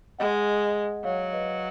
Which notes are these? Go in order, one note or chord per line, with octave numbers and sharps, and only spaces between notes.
G#3 D#5 F#5
F#3 C#5 F5
B4 D#5